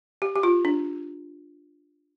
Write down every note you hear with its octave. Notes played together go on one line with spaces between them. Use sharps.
G4
G4
F4
D4